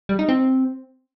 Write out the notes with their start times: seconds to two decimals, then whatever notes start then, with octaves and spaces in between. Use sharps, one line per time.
0.09 G3
0.19 D#4
0.29 C4